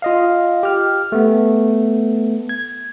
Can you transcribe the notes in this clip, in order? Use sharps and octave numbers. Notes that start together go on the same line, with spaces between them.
F4 D#5 F5
G4 F6
A3 B3
G#6